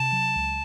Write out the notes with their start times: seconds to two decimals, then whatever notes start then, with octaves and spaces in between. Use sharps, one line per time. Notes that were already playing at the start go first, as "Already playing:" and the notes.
Already playing: C3 A5
0.12 F#3
0.35 C#2